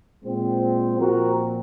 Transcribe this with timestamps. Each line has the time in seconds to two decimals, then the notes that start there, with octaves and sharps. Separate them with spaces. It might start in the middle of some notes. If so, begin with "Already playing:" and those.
0.24 A#2 G#3 C4
0.98 A#2 F3 C4 F#4 A#4